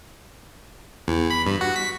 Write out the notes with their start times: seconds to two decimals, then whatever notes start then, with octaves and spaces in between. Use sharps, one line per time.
1.08 E2
1.30 B5
1.46 G2
1.61 F#4
1.76 B6